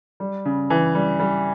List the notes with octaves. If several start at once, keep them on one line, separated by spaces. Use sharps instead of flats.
G3
C#3
E3
G3
G3